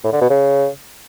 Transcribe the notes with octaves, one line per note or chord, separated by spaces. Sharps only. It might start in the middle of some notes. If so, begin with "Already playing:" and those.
A2
D3
B2
C#3